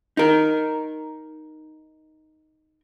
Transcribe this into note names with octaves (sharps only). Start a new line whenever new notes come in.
D#4 A#4